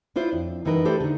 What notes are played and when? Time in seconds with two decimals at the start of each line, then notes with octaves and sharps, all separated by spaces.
0.16 D4 E4 F4 C5
0.33 F2
0.65 F#2 E3 G3 D#4 A#4 B4
0.85 A3 D4 E4 G4 A4 C5
1.00 D3 D#4